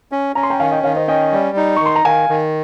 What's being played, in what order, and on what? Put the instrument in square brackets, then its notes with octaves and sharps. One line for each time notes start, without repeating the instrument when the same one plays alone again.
[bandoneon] C#4
[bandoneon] C#4 [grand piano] A#5
[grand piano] C6
G5 A#5
[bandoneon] D#3 [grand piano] F5 G#5
[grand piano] D#5 G5
[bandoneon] D#3 [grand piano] C#5 F5
[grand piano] C5 D#5
[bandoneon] C#4 [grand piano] D#5 G5
[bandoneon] G3
D#4
[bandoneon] D#3 [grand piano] C#6
[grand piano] C6
A#5
[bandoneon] D#3 [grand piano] F5 G#5
[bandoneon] D#3